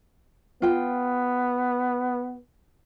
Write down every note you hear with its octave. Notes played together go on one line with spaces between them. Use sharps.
B3 F4 G5